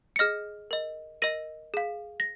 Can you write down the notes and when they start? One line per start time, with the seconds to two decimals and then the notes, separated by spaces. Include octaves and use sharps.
0.16 C#7
0.19 G#4 D#5 F6 A#6
0.71 A#4 D#5
1.22 A#4 D#5 A#6 D#7
1.74 G#4 F5
2.20 A#6